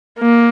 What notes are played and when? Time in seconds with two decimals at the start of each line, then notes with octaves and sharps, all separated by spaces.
0.19 A#3